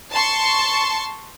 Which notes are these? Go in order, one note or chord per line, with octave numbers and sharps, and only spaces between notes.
A5 C6 C#6